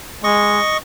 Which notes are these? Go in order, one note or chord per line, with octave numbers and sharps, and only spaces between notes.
G#3 D#5 C#6